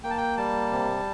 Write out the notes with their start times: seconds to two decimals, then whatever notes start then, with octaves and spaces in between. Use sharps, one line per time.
0.04 A#3 G5
0.10 A5
0.17 G5
0.38 G3 A5
0.72 C3